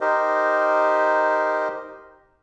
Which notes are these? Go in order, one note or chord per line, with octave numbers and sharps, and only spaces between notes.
D#4 G4 A#4 C5 D#5